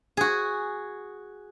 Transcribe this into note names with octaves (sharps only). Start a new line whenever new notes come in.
F#4 G#4